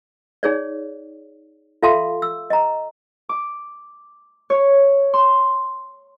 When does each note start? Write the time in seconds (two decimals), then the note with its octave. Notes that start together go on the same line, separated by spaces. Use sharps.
0.43 D#4 G#4 C#5 D5
1.83 F4 A4 E5 F5 A5 C6
2.22 E6
2.50 D#5 A#5
3.29 D6
4.50 C#5
5.14 C6